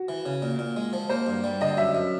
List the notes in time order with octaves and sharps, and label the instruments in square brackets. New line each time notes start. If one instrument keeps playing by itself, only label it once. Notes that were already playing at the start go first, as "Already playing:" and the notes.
Already playing: [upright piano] F#4
[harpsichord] E3
C#3
A#2
A#2
G#3
F3
[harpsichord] A#3 [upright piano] C5
[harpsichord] G2
G3
[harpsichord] D3 [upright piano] D#5
[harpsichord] F#2 [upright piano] E5
[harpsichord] F#2